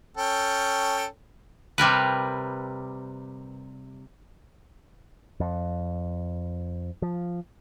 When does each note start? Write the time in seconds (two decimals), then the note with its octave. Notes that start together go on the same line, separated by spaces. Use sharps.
0.17 C#4 A4 G5
1.78 C3 G3 A#4 B4
5.40 F2
7.02 F3